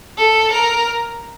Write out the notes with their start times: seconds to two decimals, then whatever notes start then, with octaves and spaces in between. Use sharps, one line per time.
0.18 A4
0.52 A#4